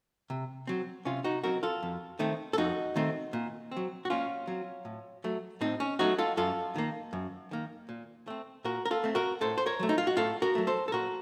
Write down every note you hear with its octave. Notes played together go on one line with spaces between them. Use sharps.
C3
F#3 C4
C3 C#4 F4
D#4 F#4
F#3 C4 F#4 A#4
F4 A4
F2
D#3 A3 C4
A4
F2 D#4 F#4
D#3 A3 C4
A#2
C4
F#3
F#4
A#2 C#4 F4
F#3 C4
A2
F#3 A3
A2 C4 D#4
C#4
F#3 A3 D#4 F#4
F4 A4
F#2 F4 A4
D#3 A#3
F#2
D#3 A#3
A#2
A3 C4
A#2 F#4 A#4
A#4
F4 A4
A3 C4
F#4 A#4
A2 A4 C5
C5
A#4 C#5
F#3 A3
D#4
F4
F#4
A2 F4 A4
F#4 A#4
F#3 A3
A4 C5
A4
A#2 F#4 A#4